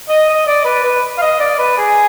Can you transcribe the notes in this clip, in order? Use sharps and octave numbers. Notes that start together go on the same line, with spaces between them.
D#5
D#5
D5
B4
B4
F5
D#5
D5
B4
G#4